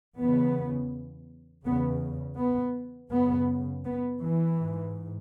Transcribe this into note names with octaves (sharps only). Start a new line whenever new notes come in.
E2 C#3 B3
E2 C#3 B3
B3
F#2 C#3 B3
B3
E3
G#2